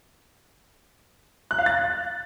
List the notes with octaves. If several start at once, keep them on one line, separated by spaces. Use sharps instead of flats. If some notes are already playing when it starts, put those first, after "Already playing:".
F#6
F5
A6